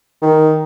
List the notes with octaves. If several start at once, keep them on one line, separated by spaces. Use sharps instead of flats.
D#3